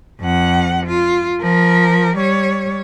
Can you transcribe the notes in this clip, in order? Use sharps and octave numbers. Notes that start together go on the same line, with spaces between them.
F2 F#5
F4
F3 A#4
G3 C#5